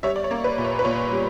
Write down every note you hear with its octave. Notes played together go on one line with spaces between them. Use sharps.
G3 C#5 E5
D5
C#5
A#3
B4
A#2
C#5
B4
A#2 C#5
G3